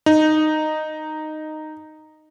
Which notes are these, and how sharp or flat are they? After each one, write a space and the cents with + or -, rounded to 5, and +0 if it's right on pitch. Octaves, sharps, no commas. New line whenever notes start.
D#4 -10